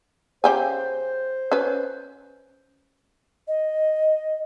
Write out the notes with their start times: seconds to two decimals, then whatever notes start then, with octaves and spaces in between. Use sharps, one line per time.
0.44 C#3 G4 C5 G#5
1.52 C#4 B4
3.48 D#5